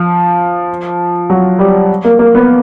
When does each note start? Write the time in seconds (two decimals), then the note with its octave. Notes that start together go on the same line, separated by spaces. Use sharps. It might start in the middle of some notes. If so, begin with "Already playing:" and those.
Already playing: F3
1.30 F#3
1.59 G3
2.05 A#3
2.19 A#3
2.35 B3